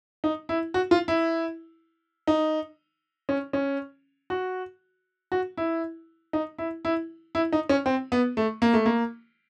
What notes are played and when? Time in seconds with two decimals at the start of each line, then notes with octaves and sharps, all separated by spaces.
0.24 D#4
0.49 E4
0.74 F#4
0.91 F4
1.08 E4
2.27 D#4
3.29 C#4
3.53 C#4
4.30 F#4
5.32 F#4
5.57 E4
6.33 D#4
6.58 E4
6.85 E4
7.35 E4
7.53 D#4
7.69 C#4
7.86 C4
8.12 B3
8.37 A3
8.62 A#3
8.74 A3
8.86 A#3